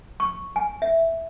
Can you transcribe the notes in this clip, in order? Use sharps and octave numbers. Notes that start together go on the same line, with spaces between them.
C#6
G#5
E5